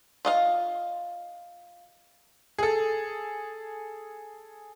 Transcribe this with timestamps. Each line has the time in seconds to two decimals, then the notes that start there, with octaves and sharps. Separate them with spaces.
0.25 F4 D#5 F5
2.59 G#4 A4